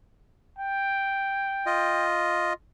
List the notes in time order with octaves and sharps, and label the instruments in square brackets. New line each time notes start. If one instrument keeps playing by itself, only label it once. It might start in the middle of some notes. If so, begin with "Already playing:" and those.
[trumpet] G5
[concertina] F4 D#5